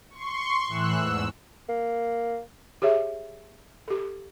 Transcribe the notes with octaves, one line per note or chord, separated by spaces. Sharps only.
C6 C#6
A2 E3 E6 F#6
E2 G#2 E6
A#3
G4 G#4 C#5 E5
G4 A4